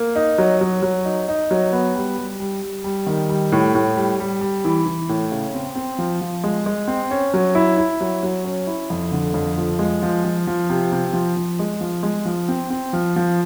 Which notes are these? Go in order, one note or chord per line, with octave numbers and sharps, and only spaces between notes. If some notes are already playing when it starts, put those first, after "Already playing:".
Already playing: A#3
D#4
F#3
F#3
F#3
D#4
D#4
F#3
B3
G3
G3
G3
G3
G3
D#3
G3
A2
A2
G3
G3
G3
E3
E3
A2
C#3
C4
C4
F3
F3
G#3
G#3
C4
C#4
F#3
E4
E4
F#3
F#3
C#4
E4
F2
D3
F2
F3
G#3
F3
F3
F3
C3
C3
F3
F3
G#3
F3
G#3
F3
C4
C4
F3
F3